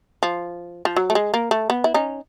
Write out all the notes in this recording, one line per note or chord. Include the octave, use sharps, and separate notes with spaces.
F3
F3
F#3
A3
G#3
A#3
A3
B3
E4
C#4 D#4